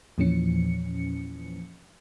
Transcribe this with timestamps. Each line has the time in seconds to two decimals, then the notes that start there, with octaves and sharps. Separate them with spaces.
0.18 E2 A#2 E3 F3 C#4 C#7